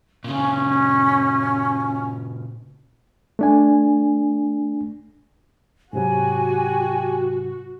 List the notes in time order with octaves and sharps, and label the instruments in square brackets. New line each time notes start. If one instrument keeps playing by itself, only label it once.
[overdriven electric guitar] A#2 C#3 [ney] C#4
[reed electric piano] A3 D4 G#5
[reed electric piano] G#2 C3 F#3 [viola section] F#4 [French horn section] G4 [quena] G#5